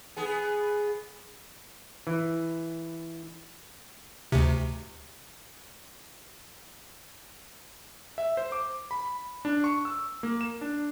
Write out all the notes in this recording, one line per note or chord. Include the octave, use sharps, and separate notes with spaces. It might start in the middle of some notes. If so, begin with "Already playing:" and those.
B3 G#4
E3
D2 C3
E5
C5
D6
B5
D4
C#6
E6
A#3
E7
D4